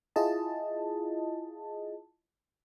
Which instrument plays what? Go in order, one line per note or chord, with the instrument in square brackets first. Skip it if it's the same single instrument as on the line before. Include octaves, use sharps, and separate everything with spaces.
[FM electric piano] E4 F4 G#4 D#5 A5